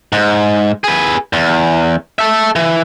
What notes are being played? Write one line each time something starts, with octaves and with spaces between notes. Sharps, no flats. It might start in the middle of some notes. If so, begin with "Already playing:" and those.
G#2
G#4 B4
E2
A4 E5
E3